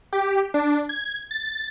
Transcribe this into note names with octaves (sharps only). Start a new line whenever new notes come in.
G4
D4
G#6
A6